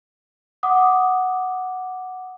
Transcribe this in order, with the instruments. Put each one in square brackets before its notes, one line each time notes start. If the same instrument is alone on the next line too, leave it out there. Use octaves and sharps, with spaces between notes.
[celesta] F#5 D6 D#6